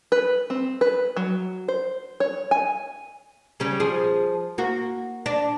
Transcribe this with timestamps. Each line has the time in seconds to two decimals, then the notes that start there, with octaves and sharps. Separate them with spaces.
0.12 B4
0.50 C4
0.81 B4
1.17 F#3
1.68 C5
2.20 C#5
2.51 G#5
3.60 C#3 G3 C#4
3.80 F3 G#4
4.58 A#3 F#4
5.26 D4